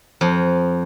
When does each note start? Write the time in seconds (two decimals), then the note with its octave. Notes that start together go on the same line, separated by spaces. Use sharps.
0.21 F2